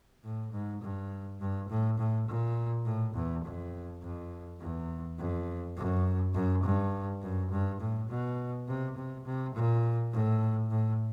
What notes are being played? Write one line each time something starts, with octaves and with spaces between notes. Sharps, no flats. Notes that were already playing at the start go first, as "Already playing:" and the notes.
A2
G#2
G2
G2
A2
A2
A#2
A2
E2
F2
F2
E2
F2
F#2
F#2
G2
F#2
G2
A2
B2
C3
C3
C3
A#2
A2
A2